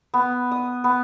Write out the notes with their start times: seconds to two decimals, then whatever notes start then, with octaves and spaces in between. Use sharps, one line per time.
0.14 B3
0.51 D#6
0.84 B3